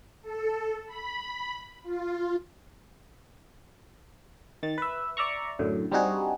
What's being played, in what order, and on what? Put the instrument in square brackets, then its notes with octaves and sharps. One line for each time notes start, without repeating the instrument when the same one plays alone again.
[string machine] A4
B5
F4
[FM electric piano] D#3 A6
B4 E5
D5 E5 A#5 C#6
F#2 A2 D3
G3 C4 D4 D#4 F#4 G#4